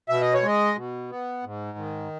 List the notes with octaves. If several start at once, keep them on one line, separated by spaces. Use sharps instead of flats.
B2 E5
D#5
C#5
G#3 D#5
B2
B3
G#2
D#3